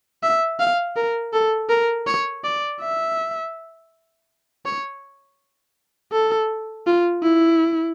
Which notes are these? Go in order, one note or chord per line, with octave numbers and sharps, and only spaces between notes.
E5
F5
A#4
A4
A#4
C#5
D5
E5
C#5
A4
F4
E4